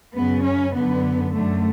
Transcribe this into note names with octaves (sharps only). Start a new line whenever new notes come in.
F#2 C#3 B3
C#4
F#2 D3 B3
F#2 D3 A3